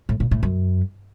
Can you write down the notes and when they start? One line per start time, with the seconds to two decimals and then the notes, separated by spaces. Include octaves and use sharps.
0.09 A2
0.20 A#2
0.31 A2
0.43 F#2